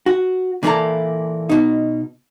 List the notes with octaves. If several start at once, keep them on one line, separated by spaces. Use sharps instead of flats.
F#4
A#2 E3 A#3 E4 A4 A#5
B2 D#4